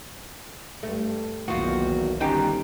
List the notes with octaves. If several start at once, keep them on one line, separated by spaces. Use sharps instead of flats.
G2 A3
B1 E2 D#3 A#3 F4 F#4
G1 D#2 C#4 D#4 G4 A#5